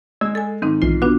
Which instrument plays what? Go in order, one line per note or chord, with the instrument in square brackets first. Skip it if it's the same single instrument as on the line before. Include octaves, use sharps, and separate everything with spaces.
[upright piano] G#3 [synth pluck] D5 E6 G#6
[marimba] A4 G#5
[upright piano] G#2 [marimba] D#3 C4 D#4
[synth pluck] B1 E3 C7 [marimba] F4
[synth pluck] B3 [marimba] D4 F4 F#4